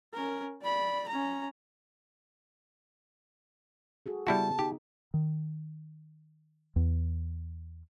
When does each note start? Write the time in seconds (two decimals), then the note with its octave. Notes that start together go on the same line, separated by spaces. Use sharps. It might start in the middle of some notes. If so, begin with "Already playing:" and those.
0.14 C#4 A#4
0.62 D5 B5
1.08 C#4 A#5
4.06 F#4 G#4 A4
4.27 C#3 G3 B3 E4 F#4 A5
4.59 D#4 G4
5.14 D#3
6.76 E2